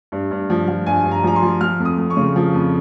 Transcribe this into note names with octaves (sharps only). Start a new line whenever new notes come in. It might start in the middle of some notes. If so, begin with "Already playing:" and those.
G2
G2
F3
F3
G2 G#5
G2
A#5
F3 A#5
C6
F3
F3 F6
F2
D#6
F2
C#6
C#3
F3
F2